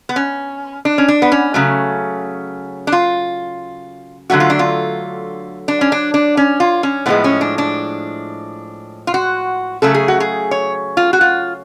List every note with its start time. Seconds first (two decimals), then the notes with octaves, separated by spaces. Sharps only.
0.09 B3
0.16 C#4
0.85 D4
0.98 C#4
1.08 D4
1.22 B3
1.32 C#4
1.54 C#3 F#3 A3
2.87 D4
2.92 F4
4.30 D3 F#3 A3 F#4
4.40 F4
4.50 D4
4.59 F4
5.68 D4
5.81 C#4
5.92 D4
6.14 D4
6.37 C#4
6.60 F4
6.83 C#4
7.06 A2 F3 G#3 B3
7.24 C#4
7.41 D4
7.58 D4
9.07 F4
9.14 F#4
9.82 C#3 F#3 A3 A4
9.94 G#4
10.08 F#4
10.20 G#4
10.51 C#5
10.97 F4
11.13 F#4
11.21 F4